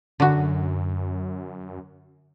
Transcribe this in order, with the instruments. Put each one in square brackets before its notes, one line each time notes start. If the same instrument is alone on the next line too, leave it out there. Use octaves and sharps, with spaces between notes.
[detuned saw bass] F#2 [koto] D3 F#4